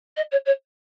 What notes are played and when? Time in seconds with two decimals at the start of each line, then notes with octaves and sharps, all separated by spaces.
0.17 D#5
0.31 C#5
0.45 C#5